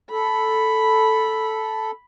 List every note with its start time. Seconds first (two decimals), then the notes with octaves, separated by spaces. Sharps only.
0.11 A4 B5